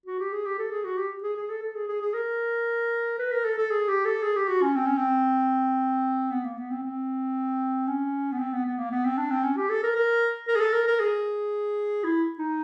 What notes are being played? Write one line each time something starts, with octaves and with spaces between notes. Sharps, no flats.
F#4
G4
G#4
G4
A4
G#4
F#4
G4
G#4
G#4
A4
A4
G#4
G#4
G#4
A#4
B4
A#4
A4
A4
G#4
G4
A4
G#4
G4
F#4
C#4
C4
C#4
C4
B3
A#3
B3
C4
C4
C#4
B3
C4
B3
B3
A#3
B3
C4
D4
C4
C#4
G4
A4
A#4
A#4
A#4
G#4
A4
A#4
A#4
G#4
E4
D#4